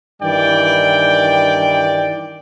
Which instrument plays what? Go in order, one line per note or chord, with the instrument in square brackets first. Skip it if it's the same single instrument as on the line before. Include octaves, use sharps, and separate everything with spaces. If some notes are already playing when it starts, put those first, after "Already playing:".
[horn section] G2 D#3 E3 D5 G5